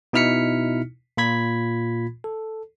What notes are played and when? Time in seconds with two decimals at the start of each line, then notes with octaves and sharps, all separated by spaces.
0.13 B2 D#4 E4 F6 B6 C#7
1.17 A#2 F4 B5 G#6 B6
2.24 A4